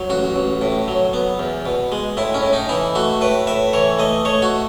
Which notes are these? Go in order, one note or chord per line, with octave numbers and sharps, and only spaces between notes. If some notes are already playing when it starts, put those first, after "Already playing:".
Already playing: F#3
A1 F#4
A1
A2
F#3
B3
E2
B2
G#3
A2 E4
C#4
A2
D#4
E3 E4
A3 F#4
A2 B4
A2 E5
E3 C#5
A3 D#5
A3 C#5
F#4